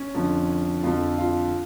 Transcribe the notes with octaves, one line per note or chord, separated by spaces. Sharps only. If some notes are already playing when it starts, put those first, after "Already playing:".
Already playing: C#4
F2 D3 F3
F2 D3 F3 F4
F4